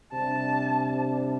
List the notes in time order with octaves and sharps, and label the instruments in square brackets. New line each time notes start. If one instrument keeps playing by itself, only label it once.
[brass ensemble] C3 G3 D4 [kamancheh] A5